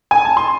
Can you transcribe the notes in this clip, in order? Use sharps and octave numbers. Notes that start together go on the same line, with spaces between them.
G#5
A5
C6